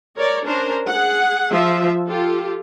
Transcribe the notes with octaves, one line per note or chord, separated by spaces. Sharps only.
A#4 C#5 D5
C#4 D4 A#4 C5
G#4 F#5
F3 E5
F4 G4 A4